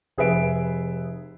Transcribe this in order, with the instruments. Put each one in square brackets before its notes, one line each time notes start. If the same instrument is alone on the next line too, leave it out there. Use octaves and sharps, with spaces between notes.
[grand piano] F1 G#4 B4 E5 D7